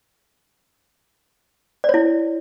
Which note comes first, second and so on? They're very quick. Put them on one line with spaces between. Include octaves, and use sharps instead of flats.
D5 C#5 E4